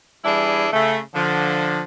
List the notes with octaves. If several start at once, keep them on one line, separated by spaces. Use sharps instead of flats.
E3 G3 D4 E4 G#4
C#3 A3
D3 F3